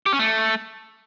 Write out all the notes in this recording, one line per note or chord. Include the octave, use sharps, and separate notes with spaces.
G4
C#4
A3